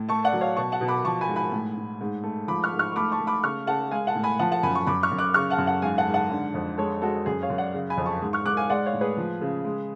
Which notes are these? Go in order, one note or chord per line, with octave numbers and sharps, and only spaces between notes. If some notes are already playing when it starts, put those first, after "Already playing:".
Already playing: A2
A3 A5 C#6
D5 F#5
F#3
C#5 F5
B2 A5 C#6
F#5 A5
B2
B5 D6
F3 A5 C#6
G#5 B5
G#2
G#5 B5
A2
A2
G#2
A3
F3 B5 D6
C#6 F6
G#2
C#6 F6
C#6
A3 B5 D6
A5 C#6
A3
B5 D6
C#3 C#6 F6
C#3 F#5 A5
G#3 F5 G#5
F#5 A5
A2
G#5 B5
F3 F#5 A5
F#5 A5
F#2 G#5 B5
A5 C#6
F#2 B5 D6
C#6 F6
F#2
D6 F#6
C#3 C#6 F6
F#5 A5
F#2
F#5 A5
G#2 F5 G#5
F#5 A5
G#2
F#5 A5
D3
F2
G#3 A4 C#5
G#3 F#4 A4
F#2 G#4
C#5 F5
F#2
D5 F#5
C#3
G#5 B5
F2
A5 C#6
G#2
C#6 F6
G#2 D6 F#6
F5 G#5
G#3 D5 F#5
C#5 F5
A2
G#4 B4
F3
C#3
G#3